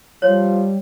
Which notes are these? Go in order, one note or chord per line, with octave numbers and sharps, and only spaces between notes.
F3 G3 C#5